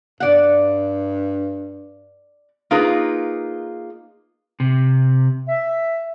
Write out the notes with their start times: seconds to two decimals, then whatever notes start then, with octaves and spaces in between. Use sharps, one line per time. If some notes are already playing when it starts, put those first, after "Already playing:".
0.20 G2 D5 F#5
2.71 A#3 D#4 F4 G#4 B4
4.60 C3
5.48 E5